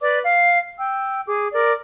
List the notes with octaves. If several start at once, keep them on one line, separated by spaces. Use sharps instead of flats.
B4 D5 D6
F5
G5 E6
G#4 D6
A#4 D5 D6